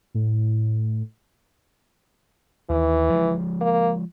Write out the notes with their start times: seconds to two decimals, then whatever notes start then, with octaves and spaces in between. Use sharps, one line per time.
0.14 A2
2.70 D#2 E3
3.10 F3 G#3
3.61 A#3